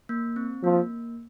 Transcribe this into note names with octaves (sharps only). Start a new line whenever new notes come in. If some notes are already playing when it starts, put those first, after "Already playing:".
A#3
C4
F3 A#3